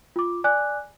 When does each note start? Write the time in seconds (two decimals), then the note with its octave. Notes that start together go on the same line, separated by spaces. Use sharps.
0.16 F4 D6
0.44 D5 G#5 D6 F#6